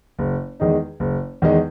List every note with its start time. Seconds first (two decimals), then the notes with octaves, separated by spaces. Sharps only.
0.19 F#1
0.60 E2 D#3 G#3 D#4
1.00 F#1
1.42 E2 D#3 G#3 D#4